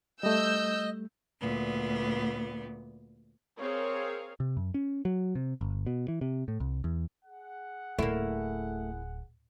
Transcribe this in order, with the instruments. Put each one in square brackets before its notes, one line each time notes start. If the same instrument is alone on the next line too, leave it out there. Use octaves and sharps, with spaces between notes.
[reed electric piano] G3 A3 [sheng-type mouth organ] D#5 [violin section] E6 G6
[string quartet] D2 A#2 B3
[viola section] C4 G#4 A#4 C#5 F5
[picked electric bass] C3
F#2
C#4
F#3
C3
G1
B2
E3
C3
A2
C2
E2
[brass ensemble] G#4 F#5
[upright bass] D1 [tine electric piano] A3 [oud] A#3 E4